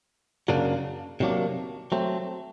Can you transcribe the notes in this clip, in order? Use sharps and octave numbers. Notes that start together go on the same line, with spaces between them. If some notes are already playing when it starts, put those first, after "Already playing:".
F#2 C#3 F#3 A#3 D4
C3 D#3 F#3 A#3 D4
F#3 A3 C4